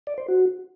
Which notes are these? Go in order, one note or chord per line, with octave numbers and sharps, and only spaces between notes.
D5
C5
F#4